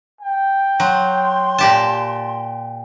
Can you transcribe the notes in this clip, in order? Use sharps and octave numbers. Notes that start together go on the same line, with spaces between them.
G5
F#3 C6
A#2 G4 A5